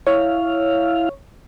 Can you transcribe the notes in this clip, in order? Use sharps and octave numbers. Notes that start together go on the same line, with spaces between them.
E4 C#5 F5